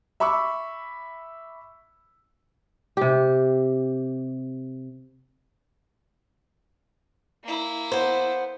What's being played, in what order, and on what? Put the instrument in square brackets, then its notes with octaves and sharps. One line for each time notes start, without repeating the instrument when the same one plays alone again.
[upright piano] E5 B5 C#6 D6 E6
[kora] C3 G4
[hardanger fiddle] A#3 E4
[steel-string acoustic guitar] B3 C5